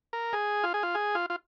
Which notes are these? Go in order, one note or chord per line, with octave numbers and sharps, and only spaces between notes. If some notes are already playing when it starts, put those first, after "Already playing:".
A#4
G#4
F4
G#4
F4
G#4
F4
F4